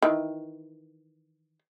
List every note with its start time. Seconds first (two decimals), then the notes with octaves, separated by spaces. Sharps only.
0.02 D#3 E3